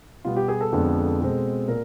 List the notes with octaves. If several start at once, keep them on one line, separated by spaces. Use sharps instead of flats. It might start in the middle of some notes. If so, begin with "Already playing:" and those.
B2 G3 B3 F4
G4
G#4
A4
F2 D3 F3 G#3 B3
B2 G#3 C4
A#2 A#4